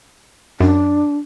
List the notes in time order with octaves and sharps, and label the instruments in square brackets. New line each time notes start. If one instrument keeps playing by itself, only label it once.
[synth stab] F#2 [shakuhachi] D4